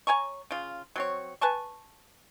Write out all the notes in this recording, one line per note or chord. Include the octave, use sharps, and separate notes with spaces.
C#5 G#5 A#5 C#6
C#3 F4
F#3 C4 C#5
B4 G#5 A5 C#6